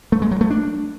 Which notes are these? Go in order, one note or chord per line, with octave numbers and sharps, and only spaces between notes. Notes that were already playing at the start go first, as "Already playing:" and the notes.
A3
G#3
F#3
A3
D4